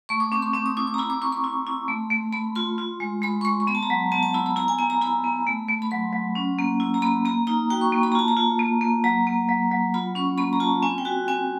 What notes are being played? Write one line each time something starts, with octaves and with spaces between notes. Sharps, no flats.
A3 C#6
D6
C4 D6
C6
C4 D6
D#6
E4 D6
D6
A#5
E4 B5
D6
E4 C#6
C6
E4
E4
A3
A3
A3 B5
F4 C6
F4
G#3
G#3 B5
C#6
G#3 C6
C6
B3 B5
A5
A#5
F#3
B3 A5
A5
E4 B5
B5
E4 A#5
G#5
B3 G#5
A#5
E4 B5
B3
A3
A3
B5
F#3 C6
F#3
C#4
A#3
E4
A#5
A#3 B5
A#3 A#5
D#4 A#5
F#4 G5
C#6
A#3
B5
A#5
F4 A5
A#5
F4
A#3
A#3
F#3 A#5
A#3
F#3
F#3
F4 B5
C#4 C#6
A#3 B5
A#5
F4 A5
C4 G#5
G5
F#4 G#5
C4 G#5